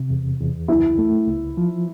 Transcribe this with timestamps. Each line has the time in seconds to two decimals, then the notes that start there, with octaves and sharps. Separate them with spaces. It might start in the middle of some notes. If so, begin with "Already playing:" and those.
Already playing: C3
0.10 E2
0.40 E2
0.68 C#2 E4
0.98 A3
1.27 C#2
1.57 F3